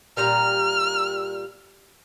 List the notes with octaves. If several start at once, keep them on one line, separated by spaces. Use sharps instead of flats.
A#2 G3 A#5 F6